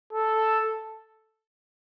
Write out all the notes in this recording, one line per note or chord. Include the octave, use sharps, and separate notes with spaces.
A4